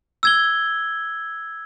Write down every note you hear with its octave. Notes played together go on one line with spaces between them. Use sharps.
E6 G#6 G7